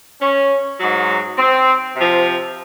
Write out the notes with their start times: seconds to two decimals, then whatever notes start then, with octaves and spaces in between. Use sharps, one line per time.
0.21 C#4
0.79 G#2 F#3
1.38 C4
1.96 C3 F3